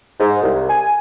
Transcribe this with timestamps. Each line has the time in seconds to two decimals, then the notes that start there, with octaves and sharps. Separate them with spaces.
0.20 G#2
0.42 C2
0.69 G#5